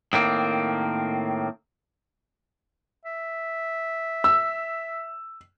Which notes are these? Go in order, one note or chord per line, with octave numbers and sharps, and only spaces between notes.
A2 D#3 A#3 C4
E5
E6